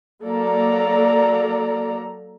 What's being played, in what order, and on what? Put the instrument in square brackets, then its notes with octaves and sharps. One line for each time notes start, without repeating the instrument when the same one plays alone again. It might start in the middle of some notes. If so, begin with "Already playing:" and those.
[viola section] F#3 A#3 A4 D5 A#5